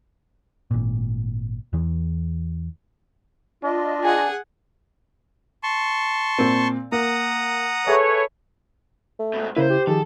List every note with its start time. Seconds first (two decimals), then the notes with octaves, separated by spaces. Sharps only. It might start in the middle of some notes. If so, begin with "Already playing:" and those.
0.71 G#1 A#2
1.73 E2 E3
3.64 D4 F4 D#5
4.03 G#4 F#5 G#5
5.63 A5 C6 C#6
6.38 A#2 C4
6.92 A#3 F#5 A#5 D#6
7.87 G#4 A4 B4 C#5 E5
9.20 A3
9.34 G#2 B2
9.57 C#3 A#3 E4 B4 C5
9.70 G4
9.87 D#3 F3 G#4 A4